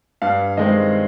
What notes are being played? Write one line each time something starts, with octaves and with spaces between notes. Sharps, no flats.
G2 F5
D#3 G#3 C4 D#5